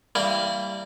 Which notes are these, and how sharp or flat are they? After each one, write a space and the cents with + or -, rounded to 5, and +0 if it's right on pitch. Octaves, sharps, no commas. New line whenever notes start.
G3 +0 A#3 -20 E4 +0